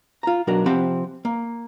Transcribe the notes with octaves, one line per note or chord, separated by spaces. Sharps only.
F4 A#5
B1 F#3 D4 F#4 A#4
C3 F3 C4 G4 F#5 B5
A#3